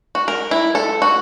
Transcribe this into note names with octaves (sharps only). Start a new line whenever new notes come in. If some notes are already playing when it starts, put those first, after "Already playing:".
F#4
A#4
E4
A4
F#4